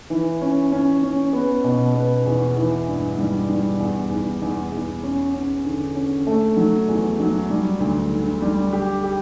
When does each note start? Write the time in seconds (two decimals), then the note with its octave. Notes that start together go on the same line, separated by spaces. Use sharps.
0.10 E3
0.41 C#4
0.72 C#4
1.03 C#4
1.33 B3
1.64 B2
1.94 B3
2.26 E2
2.57 E3
2.88 G2
3.18 G3
3.50 G3
3.80 E2
4.10 E2
4.42 E2
4.72 E2
5.03 C#4
5.33 C#4
5.65 D3
5.96 C#4
6.27 A3
6.57 F#3
6.88 E2
7.20 F#3
7.50 G3
7.80 D2
8.12 D3
8.42 G3
8.73 G4
9.04 G4